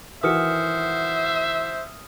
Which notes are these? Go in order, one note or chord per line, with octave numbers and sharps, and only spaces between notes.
D#3 E3 F#4 C5 E5 D#6 F6 C#7